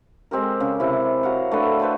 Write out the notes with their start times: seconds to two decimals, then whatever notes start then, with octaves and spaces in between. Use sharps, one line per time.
0.31 G#3 C4 G4 A#4
0.60 C#3
0.80 C3 E4
1.23 F#3 E4 F5 F#5
1.51 A3 D4 B4
1.80 B4 C5 A5 B5